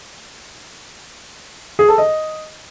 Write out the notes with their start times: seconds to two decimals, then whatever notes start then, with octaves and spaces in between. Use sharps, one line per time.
1.79 G#4
1.88 A4
1.98 D#5